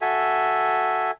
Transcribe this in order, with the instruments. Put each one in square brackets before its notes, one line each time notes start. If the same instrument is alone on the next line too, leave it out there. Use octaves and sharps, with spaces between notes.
[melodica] F#4 A4 E5 G#5